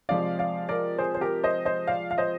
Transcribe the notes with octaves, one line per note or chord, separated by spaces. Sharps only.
C3 F3 G#3 D5 F5
D5 F5
A#4 D5
G#4 C5
C5
G4 A#4
C5 D#5
C5 D#5
D5 F5
F5
C5 D#5